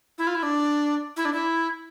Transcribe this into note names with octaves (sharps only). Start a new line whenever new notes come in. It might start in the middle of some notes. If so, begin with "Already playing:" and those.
E4
F4
E4
D4
E4
D4
E4